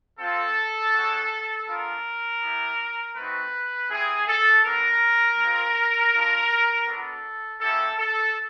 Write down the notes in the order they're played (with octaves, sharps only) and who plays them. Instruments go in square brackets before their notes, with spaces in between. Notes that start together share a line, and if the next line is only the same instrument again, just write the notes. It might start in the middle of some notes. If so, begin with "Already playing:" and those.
[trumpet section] C4 F4 A4
G#3 C#4 F#4
B3 D4 F4 A#4
B3 E4 G4
A3 C4 D#4 F#4 B4
C4 E4 G4 G#4
A4
G3 B3 D4 A#4
G#3 C4 F4
B3 D4 F4
B3 D4 F#4 A4
A#3 C#4 E4 G4 A4
A4